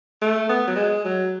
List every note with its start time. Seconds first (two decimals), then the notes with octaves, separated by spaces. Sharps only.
0.21 A3
0.49 B3
0.67 F#3
0.76 G#3
1.04 F#3